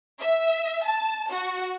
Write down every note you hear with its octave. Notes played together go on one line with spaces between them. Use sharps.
E5
A5
F#4